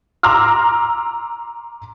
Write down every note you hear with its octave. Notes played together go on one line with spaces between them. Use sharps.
A#5 C6 D6 E6 F6